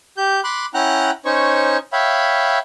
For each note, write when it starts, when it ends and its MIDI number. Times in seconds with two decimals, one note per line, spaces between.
0.17 0.41 67
0.17 0.41 91
0.44 0.66 83
0.44 0.66 84
0.44 0.66 86
0.44 0.66 90
0.74 1.11 61
0.74 1.11 64
0.74 1.11 78
0.74 1.11 79
0.74 1.11 82
0.74 1.11 90
1.25 1.77 61
1.25 1.77 63
1.25 1.77 72
1.25 1.77 73
1.25 1.77 85
1.93 2.59 73
1.93 2.59 76
1.93 2.59 77
1.93 2.59 79
1.93 2.59 83